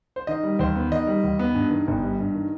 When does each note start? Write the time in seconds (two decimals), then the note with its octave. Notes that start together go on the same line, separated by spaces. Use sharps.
0.16 C5
0.27 D#3 D#5
0.43 G3
0.59 D#2 C5
0.76 B3
0.92 D#3 D#5
1.07 G3
1.24 D#2
1.39 B3
1.55 G2
1.71 D#3
1.87 G1
2.03 G3
2.20 G2
2.35 D#3